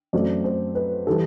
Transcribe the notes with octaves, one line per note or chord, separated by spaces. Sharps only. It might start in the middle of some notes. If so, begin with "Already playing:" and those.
F#2 F#3 A3 C4 D5
C5
B4
E3 G3 A4